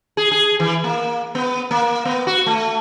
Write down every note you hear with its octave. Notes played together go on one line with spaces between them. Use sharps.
G#4
G#4
E3
A#3
B3
A#3
B3
F#4
A3